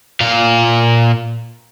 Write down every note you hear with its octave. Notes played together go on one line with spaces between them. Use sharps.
A#2 F5